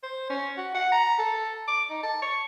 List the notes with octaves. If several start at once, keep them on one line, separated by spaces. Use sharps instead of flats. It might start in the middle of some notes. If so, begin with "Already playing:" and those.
C5
C#4
F#4
F#5
A#5
A4
D6
D#4
A5
C#6